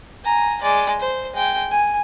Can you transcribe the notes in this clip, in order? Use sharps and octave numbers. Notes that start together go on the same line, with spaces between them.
G#5 A#5
G#3 D5
C5
G#3 G5
G#5